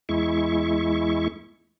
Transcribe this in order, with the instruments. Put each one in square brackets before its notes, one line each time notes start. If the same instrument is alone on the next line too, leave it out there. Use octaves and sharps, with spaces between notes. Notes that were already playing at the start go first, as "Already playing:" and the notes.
[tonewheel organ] E2 G#3 E4 C#6